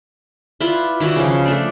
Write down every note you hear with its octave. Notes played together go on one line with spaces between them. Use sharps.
E4 F4 B4 D5
D#3 E4 F#4 D5
C#3 F3
A3 D4 D5